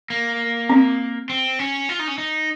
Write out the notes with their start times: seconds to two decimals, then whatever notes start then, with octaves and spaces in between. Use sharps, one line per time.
0.10 A#3
0.69 C4
1.30 C4
1.59 C#4
1.89 F4
1.99 D#4
2.08 C#4
2.18 D#4